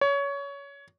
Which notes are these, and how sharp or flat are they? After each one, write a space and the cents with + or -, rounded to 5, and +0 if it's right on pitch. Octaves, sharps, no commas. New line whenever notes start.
C#5 +20